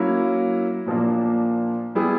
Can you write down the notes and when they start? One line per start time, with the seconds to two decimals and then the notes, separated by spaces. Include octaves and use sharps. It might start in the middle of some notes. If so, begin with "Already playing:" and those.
Already playing: F#3 A#3 C#4 E4
0.86 A#2 F3 A#3 D4
1.95 G3 B3 E4 G#4